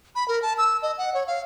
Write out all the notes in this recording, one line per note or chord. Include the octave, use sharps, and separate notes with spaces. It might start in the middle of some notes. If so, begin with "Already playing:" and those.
B5
A#4
A5
E6
D#5
F#5
C#5
F5